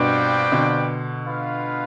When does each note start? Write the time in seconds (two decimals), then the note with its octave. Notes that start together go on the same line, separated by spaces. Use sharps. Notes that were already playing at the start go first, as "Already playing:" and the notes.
Already playing: G2 B2 C4 F4 B4 D5 G5
0.52 B2 D3
1.26 B3 F4 B4 F5